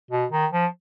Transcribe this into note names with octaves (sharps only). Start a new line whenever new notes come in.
B2
D#3
F3